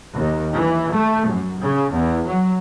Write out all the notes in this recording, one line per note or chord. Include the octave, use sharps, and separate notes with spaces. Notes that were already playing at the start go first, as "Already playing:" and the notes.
D#2
E3
A3
F#2
C#3
E2
F#3